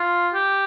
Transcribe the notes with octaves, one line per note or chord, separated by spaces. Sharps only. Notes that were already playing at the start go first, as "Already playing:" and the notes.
Already playing: F4
G4